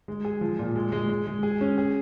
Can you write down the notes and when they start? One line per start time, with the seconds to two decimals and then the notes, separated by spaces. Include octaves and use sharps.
0.08 G#3
0.25 G#4
0.41 F3
0.59 A#2
0.75 G#3
0.92 G#3
1.09 G#3
1.27 G#3
1.43 G#4
1.61 C#4
1.78 G#4